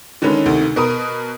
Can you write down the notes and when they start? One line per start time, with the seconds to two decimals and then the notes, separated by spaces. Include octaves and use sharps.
0.22 D3 D#3 G#3 C#4 B4
0.46 D2 C3 D#3
0.76 B2 A#4 B4 D#6